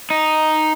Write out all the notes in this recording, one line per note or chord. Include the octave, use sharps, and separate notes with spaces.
D#4